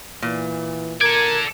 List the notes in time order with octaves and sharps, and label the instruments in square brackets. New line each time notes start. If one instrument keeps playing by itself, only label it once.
[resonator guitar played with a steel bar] A#2 [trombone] E3
[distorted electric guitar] A4 D5 [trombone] A#4 [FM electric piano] G#6